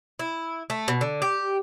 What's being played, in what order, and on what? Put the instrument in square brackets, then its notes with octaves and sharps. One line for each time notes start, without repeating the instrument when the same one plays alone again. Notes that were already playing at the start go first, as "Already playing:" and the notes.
[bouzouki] E4
A3
B2
D3
G4